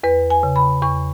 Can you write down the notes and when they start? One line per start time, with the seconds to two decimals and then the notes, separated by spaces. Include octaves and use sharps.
0.04 E2 B4
0.30 G#5
0.43 C#3
0.56 B5
0.82 E2 C#6